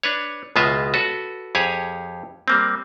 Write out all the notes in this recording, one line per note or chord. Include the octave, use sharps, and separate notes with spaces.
D4 B4 C#5
C#2 B2 G#3 F4 D#5 E5
F#4 A4 B4
F2 G4 G#4 C#5 G#5
G3 A#3 C4